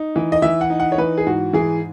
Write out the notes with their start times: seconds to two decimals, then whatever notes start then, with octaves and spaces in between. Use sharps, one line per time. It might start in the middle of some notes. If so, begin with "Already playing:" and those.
Already playing: D#4
0.16 E3
0.32 D#5
0.42 E3 E5
0.61 F#5
0.70 D#4
0.80 F#5
0.92 C#5
0.98 E3 B4
1.18 G#4
1.27 G#2 F#4
1.53 E3 G#4